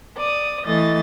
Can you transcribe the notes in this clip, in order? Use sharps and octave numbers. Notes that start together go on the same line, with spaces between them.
D5 D#6
E3 A3 D#5 A6